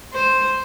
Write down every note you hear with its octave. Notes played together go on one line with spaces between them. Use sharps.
C5